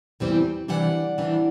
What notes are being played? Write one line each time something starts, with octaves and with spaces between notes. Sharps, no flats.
E2 C3 E3 G3 C4
C3 E3 G3 D4 D5 F#5
C3 E3 G3 D4